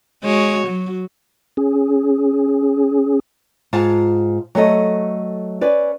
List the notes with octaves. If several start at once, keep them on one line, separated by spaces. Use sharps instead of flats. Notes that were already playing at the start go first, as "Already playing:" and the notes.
G#3 F#4 C#5
F#3
C#4 G#4
G#2 F4 F5 A5
F#3 A3 A4 D#5
C#4 B4 D5